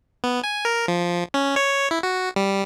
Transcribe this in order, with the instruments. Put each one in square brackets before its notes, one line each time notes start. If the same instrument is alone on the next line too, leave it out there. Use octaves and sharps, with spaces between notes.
[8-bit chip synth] B3
G#5
A#4
F3
C#4
C#5
E4
F#4
G3